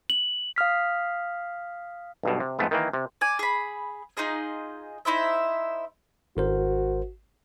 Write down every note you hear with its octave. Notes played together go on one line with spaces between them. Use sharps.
F#7
F5 D#6 F6 B6
B1 G2 B2
C3
F2 G#2 A3 B3
D#3 E3 A#3
C3
D5 G#5
G#4 B5
D#4 F4 G#4 D#5
D#4 E4 C5 E5
G#1 F#4 A#4 C5